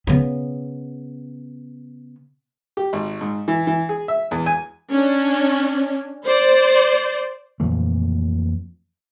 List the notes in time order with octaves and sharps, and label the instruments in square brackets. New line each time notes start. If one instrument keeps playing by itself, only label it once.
[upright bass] C#3 B3
[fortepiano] G4
G#1
G#2
E3
E3
G#4
E5
E2
G#5
[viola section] C#4 D4
C5 D5
[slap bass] F2 A#2 E3 A3